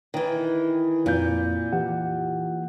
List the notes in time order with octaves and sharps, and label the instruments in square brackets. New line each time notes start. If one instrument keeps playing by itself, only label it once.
[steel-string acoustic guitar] D#3 E3
[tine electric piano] F2 G6 [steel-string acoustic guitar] A#2
[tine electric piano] E3 G4 F#5